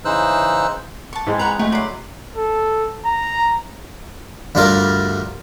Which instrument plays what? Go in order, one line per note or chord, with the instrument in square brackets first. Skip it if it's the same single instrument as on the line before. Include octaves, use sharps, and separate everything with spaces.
[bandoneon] C#3 E3 D#4 C5 E6 F#6
[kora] F#5 [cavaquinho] A5 C#6
[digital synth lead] G#2 [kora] E3 G#3 C4
[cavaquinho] B4 F#5 C#6 [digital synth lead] A#5
[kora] D3 G#3 [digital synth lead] A3 [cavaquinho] F#4
[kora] F#3 B4 C5 [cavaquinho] D5 C6
[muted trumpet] A4
A#5
[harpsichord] D2 G2 G3 F4 A#4 D5